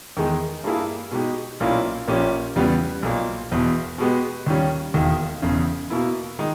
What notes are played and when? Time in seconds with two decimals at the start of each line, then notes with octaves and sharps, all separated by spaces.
0.17 E2 D#3 G#3 D#4 G#4
0.64 G2 G3 A#3 E4 G#4
1.11 B2 G#3 D#4 G4
1.60 B1 A#2 A#3 C#4 E4
2.07 A#1 A#2 A#3 C#4 G4
2.56 E2 C#3 G3 B3
3.03 B1 A#2 A#3
3.52 E1 E2 B2
3.98 B2 G#3 B3 G4
4.46 D#2 D#3 G3 C#4
4.94 E1 D#2 D#3
5.42 E1 E2 C#3
5.90 B2 A#3 E4
6.39 D#3 G#3 D#4